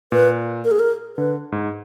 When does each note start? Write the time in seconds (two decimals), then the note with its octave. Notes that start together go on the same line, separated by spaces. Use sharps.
0.12 A#2 B4
0.65 A#4
0.71 G#4
0.79 A#4
1.17 D3 B4
1.52 G#2